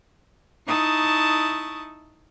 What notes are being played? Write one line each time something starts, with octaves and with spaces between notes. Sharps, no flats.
D#4 E4 A5 C#6 D#6